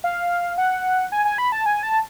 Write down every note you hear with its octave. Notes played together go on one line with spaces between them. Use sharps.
F5
F#5
G#5
G#5
B5
A5
G#5
A5